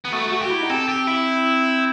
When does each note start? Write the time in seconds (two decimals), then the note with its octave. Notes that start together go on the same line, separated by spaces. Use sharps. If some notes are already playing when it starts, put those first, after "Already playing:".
0.05 B3
0.12 A3 F#4
0.31 F#4
0.41 G4
0.50 E4
0.61 D#4
0.69 C4 A4
0.89 G4
1.07 E4